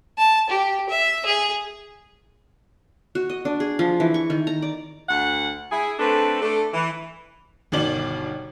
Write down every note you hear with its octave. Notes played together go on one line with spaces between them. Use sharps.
A5
G4
E5
G#4
F#4
D#5
D4
G#4
F3
E3
C#6
D#3
A#5
D5
D2 F#5
E4 G#4
A3 C4 D4 A4 B4
A3 D4 A4
E3
G1 B2 D#3 D5 F#7